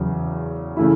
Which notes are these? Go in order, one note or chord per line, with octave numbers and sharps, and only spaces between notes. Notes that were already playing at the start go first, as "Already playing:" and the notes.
Already playing: E2 C#3 F#3
C#3 E3 A3 E4